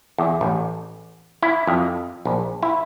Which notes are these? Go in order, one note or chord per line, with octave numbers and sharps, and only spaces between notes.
E2
A1
E4
F2
A#1
E4